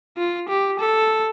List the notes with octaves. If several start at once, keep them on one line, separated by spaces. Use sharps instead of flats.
F4
G4
A4